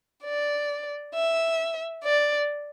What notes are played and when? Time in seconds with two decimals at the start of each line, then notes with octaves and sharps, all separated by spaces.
0.24 D5
1.15 E5
2.04 D5